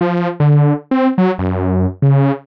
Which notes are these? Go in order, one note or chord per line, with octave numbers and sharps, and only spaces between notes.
F3
D3
C4
F#3
F#2
C#3